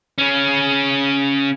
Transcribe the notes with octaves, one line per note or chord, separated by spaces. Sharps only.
C#3 C#4